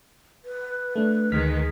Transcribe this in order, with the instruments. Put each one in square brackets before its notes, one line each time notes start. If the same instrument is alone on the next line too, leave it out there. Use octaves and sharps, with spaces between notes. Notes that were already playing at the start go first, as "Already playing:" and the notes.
[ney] B4
[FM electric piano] A3 D4
[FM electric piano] D2 F6 B6 [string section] D#3 G#3